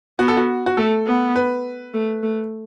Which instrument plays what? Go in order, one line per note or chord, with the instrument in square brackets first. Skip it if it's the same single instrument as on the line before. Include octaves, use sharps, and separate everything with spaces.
[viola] B3 [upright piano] F#4
[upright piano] A4
F#4
F#4
[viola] A3 [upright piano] A4
[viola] B3
[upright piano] B4
[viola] A3
A3